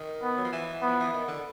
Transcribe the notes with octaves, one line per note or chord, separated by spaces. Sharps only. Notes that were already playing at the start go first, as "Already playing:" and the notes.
Already playing: D#3
B3
F#3
F3
E3
F3 B3
E3
D#3
D3